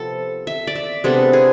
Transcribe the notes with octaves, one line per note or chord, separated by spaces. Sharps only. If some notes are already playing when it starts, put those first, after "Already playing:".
Already playing: C3 F3 B3 A4
E5
D5
E5
C3 G#3 B3 D4 A4
G#4